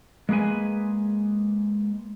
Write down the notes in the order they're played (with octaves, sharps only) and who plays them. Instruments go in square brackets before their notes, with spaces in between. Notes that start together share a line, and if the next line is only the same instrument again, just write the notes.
[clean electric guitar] G#3 A#3 G#4 B4 G#5